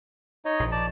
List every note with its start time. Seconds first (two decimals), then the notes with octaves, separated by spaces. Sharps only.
0.45 D#4 C#5 D#5
0.60 A#1 F3
0.72 D5 A5